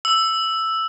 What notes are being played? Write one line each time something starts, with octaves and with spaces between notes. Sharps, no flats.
E6